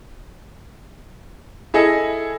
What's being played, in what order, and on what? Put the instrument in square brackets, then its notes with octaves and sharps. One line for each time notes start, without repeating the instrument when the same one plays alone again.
[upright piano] E4 G#4 A4 D#5